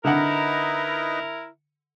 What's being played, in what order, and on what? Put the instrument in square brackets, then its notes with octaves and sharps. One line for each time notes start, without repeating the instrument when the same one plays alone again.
[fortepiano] D3 F#5 [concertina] D#4 B4 D#5 [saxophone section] E4 A#4